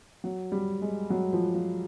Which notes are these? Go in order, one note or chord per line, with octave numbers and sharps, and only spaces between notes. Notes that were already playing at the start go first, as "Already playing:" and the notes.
F#3
G3
G#3
F#3
F3
F3